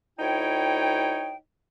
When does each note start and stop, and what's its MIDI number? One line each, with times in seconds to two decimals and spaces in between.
0.19 1.35 38
0.19 1.35 63
0.19 1.35 64
0.19 1.35 73
0.19 1.35 79